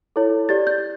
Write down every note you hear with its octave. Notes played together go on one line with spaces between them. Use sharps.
E4 A4 C#5
G4 D5 A6
G6